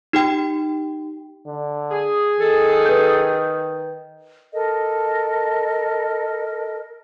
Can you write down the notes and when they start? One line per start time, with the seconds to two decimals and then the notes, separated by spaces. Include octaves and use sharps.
0.13 D#4 G4 G5
1.47 D3
1.91 G#4
2.40 D#3 A4
2.86 B4 G6
4.53 A4 A#4 D#5